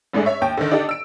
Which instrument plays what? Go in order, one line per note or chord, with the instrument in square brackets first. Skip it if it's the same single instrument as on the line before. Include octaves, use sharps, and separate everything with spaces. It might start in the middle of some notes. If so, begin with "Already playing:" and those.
[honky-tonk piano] A1 G#2 A3 D4 G#4
C#5 E5 C#6
D#2 G5
D3 D#3
D4 D#4 G4 A4
E6 D7